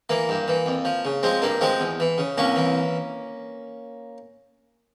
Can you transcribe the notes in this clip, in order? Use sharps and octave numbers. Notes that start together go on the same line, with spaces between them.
E3 A#3
G2
E3
F2
F3
C#3
F3 G#3 C4
G2 A#3
F3 G#3 C4
E2
E3
C#3
C2 A#3 C#4
E3